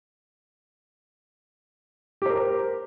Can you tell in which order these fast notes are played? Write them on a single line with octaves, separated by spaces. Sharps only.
G4 C5 A#4